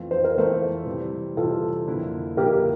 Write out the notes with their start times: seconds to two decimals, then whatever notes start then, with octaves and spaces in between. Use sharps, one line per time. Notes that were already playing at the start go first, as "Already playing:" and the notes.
Already playing: F2 E3 A3 C4 F4
0.11 C5
0.24 A#4
0.36 F2 E3 A3 C4 F4 A4 C5
0.86 C3 E3 G3 C4
1.36 C3 E3 G3 C4 F4 A4
1.87 F2 D3 F3 A#3 E4
2.37 F2 D3 F3 A#3 E4 G4 A#4